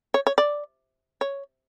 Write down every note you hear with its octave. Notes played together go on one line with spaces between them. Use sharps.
C#5
C#5
D5
C#5